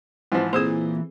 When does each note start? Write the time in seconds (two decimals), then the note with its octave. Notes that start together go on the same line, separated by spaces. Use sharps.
0.32 G#2 E3 F3
0.53 A#2 C4 G#4 A4 C5 D#6